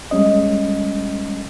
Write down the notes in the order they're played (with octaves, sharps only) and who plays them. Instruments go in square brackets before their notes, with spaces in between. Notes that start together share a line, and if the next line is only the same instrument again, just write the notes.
[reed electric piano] G3 G#3 C#4 D#5